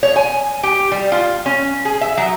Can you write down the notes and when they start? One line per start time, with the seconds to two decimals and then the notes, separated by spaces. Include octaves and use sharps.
0.03 C#5
0.16 G#5
0.63 G4
0.92 G3
1.12 F4
1.46 C#4
1.85 G#4
2.01 E5
2.17 F#3